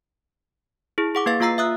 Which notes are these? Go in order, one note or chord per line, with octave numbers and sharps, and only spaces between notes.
E4 G#4
G#4 F#5 D6
A#3 B4 F5 A6
A#3 F4 F5 A#5 E6 C7
E5 D#6 F#6